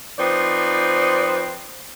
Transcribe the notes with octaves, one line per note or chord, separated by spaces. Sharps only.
F3 C4 D#4 B4 C5 D5